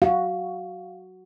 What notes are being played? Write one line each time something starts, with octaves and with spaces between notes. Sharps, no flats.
F#4 F5